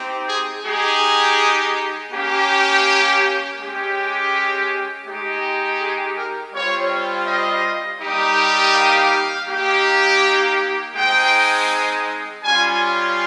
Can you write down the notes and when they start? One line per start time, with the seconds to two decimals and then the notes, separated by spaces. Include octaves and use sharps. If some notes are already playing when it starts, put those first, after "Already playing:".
Already playing: C4 D#4 G4
0.28 G#4
0.65 G#3 D#4 G4 G#4
2.12 A#3 C#4 G4
3.60 G#3 C#4 G4
5.07 G#3 D#4 G4
5.80 G#4
6.17 A#4
6.54 G3 C4 F4 C#5
7.27 D#5
8.01 G3 A#3 D#4 G4
8.75 F5
9.48 A#3 D#4 G4
10.96 G#3 C4 D#4 G5
12.43 G3 C#4 F4 G#5